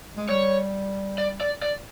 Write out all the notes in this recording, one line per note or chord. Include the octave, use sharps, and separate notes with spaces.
G#3
G3 C#5
D5
D5
D5